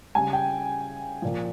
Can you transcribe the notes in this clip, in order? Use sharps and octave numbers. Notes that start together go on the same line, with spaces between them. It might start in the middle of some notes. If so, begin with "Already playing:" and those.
C#3 G3 G#5
G5
A#2 F3